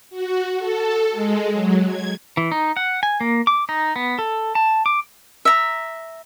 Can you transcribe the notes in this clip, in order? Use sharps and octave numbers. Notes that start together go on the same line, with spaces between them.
F#4
A4
G#3
F#3
G#6
E3
D#4
F#5
G#5
A#3
D6
D#4
B3
A4
A5
D6
E5 A#5